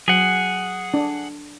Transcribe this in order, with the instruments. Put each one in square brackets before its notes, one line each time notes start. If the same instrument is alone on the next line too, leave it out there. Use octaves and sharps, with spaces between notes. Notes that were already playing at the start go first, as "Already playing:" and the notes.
[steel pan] F#3 [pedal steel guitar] G#4 F#5
[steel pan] D4